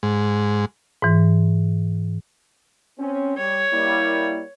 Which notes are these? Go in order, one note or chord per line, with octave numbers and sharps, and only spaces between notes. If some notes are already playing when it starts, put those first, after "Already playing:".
G#2
G#2 E3
C4 C#4
G3 C#5
G3 A#3 E4